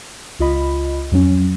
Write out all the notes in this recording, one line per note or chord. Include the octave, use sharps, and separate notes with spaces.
C#2 F4 D#5 B5
F2 F#3 C#4